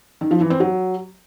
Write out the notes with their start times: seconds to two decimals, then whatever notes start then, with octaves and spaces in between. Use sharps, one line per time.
0.21 D#3
0.31 F3
0.41 E3
0.50 C4
0.60 F#3